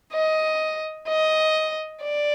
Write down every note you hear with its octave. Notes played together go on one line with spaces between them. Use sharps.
D#5
D#5
D5